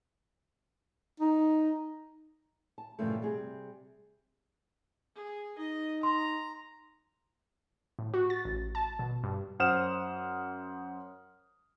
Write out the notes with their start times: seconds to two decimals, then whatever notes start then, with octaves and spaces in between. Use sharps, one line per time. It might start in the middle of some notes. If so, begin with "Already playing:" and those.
1.20 D#4
2.78 A5
2.99 G2 A#2 C#3 E3 F3 A3
3.22 C3 G3 G#4
5.16 G#4
5.58 D#4 D#5
6.03 A#5 C6
7.99 A2
8.14 F#4
8.30 A6
8.45 A1
8.75 A5
8.99 B2
9.24 G2
9.59 F#2 C5 F#5 D#6 F6 E7